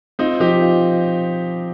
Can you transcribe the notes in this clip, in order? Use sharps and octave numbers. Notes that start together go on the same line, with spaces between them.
C4 D#4 F4
F3 D#4 G4
F4